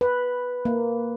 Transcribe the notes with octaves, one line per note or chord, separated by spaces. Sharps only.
B4
A#3